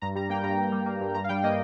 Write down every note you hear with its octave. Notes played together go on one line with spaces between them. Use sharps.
G2 A#5
G3 A#5
A#3 G5
G2 A#5
G2
G3
A#3
G2
G2 A#5
F5
G3 G5
A#3 D#5